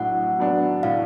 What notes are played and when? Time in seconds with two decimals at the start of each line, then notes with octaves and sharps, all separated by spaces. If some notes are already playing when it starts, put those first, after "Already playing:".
Already playing: A2 F#3 D4 F#5
0.39 F#3 B3 D4
0.83 A2 F5